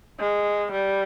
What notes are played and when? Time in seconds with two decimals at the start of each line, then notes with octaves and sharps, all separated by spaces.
0.19 G#3
0.72 G3